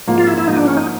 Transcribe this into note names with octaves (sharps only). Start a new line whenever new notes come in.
G#2 F3 A#3
F4
E4
E4
G#2 F3 A#3 D#4
D4
C#4
D#4